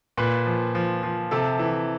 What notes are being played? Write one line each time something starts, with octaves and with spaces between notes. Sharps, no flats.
A#2 B4
F3
F3
F3
C3 A4
E3